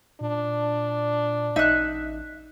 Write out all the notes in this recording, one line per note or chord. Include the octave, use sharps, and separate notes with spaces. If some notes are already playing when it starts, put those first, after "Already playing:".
A#2 D4
A1 D#4 E5 F#6